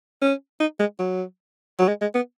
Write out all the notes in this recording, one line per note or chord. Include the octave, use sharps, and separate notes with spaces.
C#4
D#4
G#3
F#3
F#3
G#3
G#3
B3